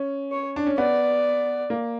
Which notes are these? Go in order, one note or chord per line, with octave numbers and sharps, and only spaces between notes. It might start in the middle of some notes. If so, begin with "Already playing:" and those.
Already playing: C#4
C#5
D4
C#4
B3 D5
A#3